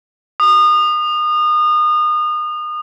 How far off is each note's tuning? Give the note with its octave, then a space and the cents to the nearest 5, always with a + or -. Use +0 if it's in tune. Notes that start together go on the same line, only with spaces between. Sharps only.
D#6 -30